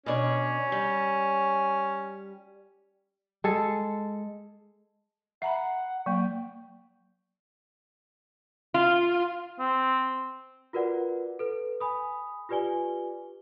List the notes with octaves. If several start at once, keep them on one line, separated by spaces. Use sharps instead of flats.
B2 C#4 D4 C#5
G3
G#3 A4
E5 F#5 A#5 B5
F#3 A#3 G5
F4
C4
F4 F#4 A#4 B4 D5 F#5
A4 B4
G#5 B5 D#6
F4 G4 B4 D5 G#5 G7